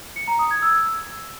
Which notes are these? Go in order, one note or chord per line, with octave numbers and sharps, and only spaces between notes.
C#7
A#5
D#6
G#6
E6